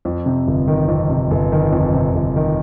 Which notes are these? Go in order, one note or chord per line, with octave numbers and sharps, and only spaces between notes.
F2
C3
G1
D#3
F2
C3
G1
D#3
F2
C3
G1
D#3